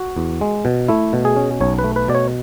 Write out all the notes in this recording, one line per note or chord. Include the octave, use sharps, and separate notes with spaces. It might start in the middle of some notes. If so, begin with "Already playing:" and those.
Already playing: F#4
E2
G#3
B2
A3 E4
B2
G#4
C#4
B1 C#5
B4
A3
B4
B2 D5
C#5